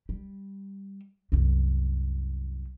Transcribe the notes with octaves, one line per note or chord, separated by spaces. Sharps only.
G3
C2 F#2